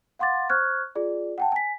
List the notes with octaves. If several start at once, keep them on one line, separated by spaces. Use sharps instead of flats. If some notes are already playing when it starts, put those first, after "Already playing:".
F5 F#5 C6 D6 A6
C5 C#6 F6 F#6 G#6
F4 G#4 D5
F#5 G5 A5
G#5 B6